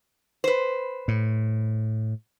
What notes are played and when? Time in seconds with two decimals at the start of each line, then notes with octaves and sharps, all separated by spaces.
0.44 B4 C5
1.08 A2